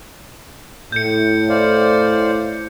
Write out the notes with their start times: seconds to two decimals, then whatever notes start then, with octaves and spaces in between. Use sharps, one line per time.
0.92 A2 G6 C#7
1.49 C5 D5 F5